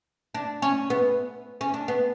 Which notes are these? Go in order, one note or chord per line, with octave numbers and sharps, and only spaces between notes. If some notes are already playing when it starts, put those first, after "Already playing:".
D4
C#4
B3
C#4
D4
B3